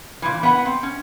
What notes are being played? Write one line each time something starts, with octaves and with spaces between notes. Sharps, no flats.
A#2 E3
B3 F#5
C4
C#4